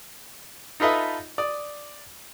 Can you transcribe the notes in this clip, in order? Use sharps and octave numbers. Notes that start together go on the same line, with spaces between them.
D#4 F4 A4 B4 D#5 E5
D5 D#6